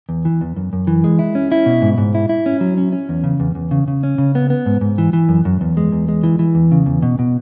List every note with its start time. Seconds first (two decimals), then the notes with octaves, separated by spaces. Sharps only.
0.09 E2
0.25 E3
0.41 E2
0.57 F#2
0.73 F#2
0.87 E3
1.04 G#3
1.19 E4
1.35 C#4
1.52 E4
1.66 B2
1.82 G#2
1.98 G#2
2.15 E4
2.29 E4
2.46 C#4
2.61 F#3
2.78 C#4
2.93 C#4
3.09 E2
3.24 C#3
3.40 E2
3.55 E2
3.71 C#3
3.88 C#3
4.03 C#4
4.18 C#3
4.35 B3
4.50 B3
4.66 G#2
4.81 G#2
4.98 E3
5.13 E3
5.29 F#2
5.45 F#2
5.61 E2
5.77 G#3
5.92 E2
6.08 G#3
6.24 E3
6.39 E3
6.55 E2
6.72 C#3
6.86 E2
7.03 B2
7.19 B2